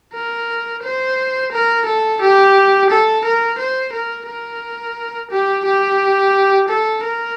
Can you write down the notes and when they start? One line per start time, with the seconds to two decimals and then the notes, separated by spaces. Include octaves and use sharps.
0.14 A#4
0.83 C5
1.52 A#4
1.86 A4
2.21 G4
2.90 A4
3.25 A#4
3.58 C5
3.92 A#4
4.27 A#4
5.31 G4
5.65 G4
6.68 A4
7.04 A#4